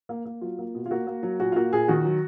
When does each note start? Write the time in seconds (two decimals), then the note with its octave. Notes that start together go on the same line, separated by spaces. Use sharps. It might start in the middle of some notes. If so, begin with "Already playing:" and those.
0.09 A#3
0.26 A#3
0.41 F#3 F4
0.59 A#3
0.75 B2
0.86 F4
0.91 A#3 F#4
1.07 A#3
1.23 F#3
1.40 A#2 F#4
1.52 F4
1.56 A#3 F#4
1.73 A#2 G#4
1.88 D#3 F#4
2.05 F#3